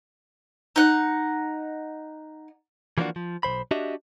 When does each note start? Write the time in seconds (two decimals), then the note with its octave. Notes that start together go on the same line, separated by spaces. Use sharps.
0.76 D#4 F#5
2.98 E3 F3 A#3 B3 D4 F#4
3.16 F3
3.43 B1 B2 C5 B5
3.71 D4 F#4 G4 D#5 E5